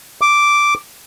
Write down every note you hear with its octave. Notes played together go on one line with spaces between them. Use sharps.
D6